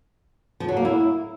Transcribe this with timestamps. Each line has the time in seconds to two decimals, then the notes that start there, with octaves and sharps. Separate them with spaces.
0.60 F3
0.69 F#3
0.77 A#3
0.85 E4